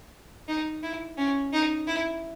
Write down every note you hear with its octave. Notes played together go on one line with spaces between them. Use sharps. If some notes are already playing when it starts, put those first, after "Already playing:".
D#4
E4
C#4
D#4
E4